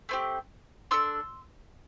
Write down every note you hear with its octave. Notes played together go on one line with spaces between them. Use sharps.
A3 C4 G4
D4 A4 C6 E6